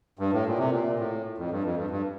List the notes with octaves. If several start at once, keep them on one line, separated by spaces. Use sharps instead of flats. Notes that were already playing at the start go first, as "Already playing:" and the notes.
G2
A2
A#2
C3
A#2
A2
F2
G2
F2
G2
G2